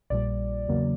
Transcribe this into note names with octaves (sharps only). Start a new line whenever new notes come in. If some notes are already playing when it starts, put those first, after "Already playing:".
A#1 A#2 G3 D5
E2 C#3 F#3 A#3